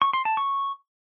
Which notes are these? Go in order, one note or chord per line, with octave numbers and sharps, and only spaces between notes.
C#6
C6
A5
C#6